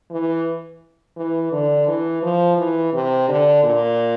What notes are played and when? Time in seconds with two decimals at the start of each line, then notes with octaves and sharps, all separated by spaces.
0.11 E3
1.17 E3
1.52 D3
1.87 E3
2.22 F3
2.58 E3
2.93 C3
3.28 D3
3.63 A#2